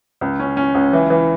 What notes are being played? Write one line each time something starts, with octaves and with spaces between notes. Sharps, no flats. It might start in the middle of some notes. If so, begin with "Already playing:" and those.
C#2
C#4
C#4
C#2
E3
E3